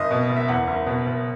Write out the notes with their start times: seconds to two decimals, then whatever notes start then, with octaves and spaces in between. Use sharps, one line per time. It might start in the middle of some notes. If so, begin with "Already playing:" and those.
Already playing: F#1 D#5
0.11 B2
0.30 F#1
0.37 E5
0.48 E2 F#5
0.68 F#1
0.86 B2
1.06 F#1